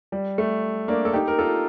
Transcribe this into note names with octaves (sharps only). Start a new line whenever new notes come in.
G3
A3
A#3 D4
A4
D#4 G4
A#4
F4 A4